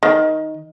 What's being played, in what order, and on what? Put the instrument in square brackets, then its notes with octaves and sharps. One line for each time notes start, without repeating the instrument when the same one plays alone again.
[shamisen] D#3